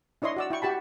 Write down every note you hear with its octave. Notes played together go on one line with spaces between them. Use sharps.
D4 E4 C#5 D#5 C6
F#4 D5 E6
E4 G5 C#6
F#4 G4 A5 B5